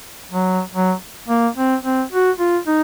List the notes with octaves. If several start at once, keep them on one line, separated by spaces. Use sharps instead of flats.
F#3
F#3
A#3
C4
C4
F#4
F4
D#4